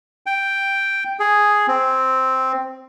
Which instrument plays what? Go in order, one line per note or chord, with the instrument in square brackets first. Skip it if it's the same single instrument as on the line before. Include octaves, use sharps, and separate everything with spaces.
[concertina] G5
G#4
C4